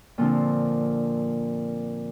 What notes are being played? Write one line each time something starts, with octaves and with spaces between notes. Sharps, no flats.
A#2 D3 F3 C4